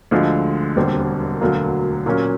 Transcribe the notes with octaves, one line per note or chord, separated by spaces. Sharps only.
D2 D3 F3 G#3
E1 D#2 D3 G3 C4
E1 D2 D3 F#3 A#3
A#2 F#3 A#3 C#4